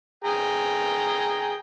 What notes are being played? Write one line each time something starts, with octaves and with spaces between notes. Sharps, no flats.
G#4 G5 A#5